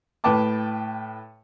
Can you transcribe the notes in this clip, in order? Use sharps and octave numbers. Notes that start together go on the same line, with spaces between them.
A2 B4 G5 A5 D6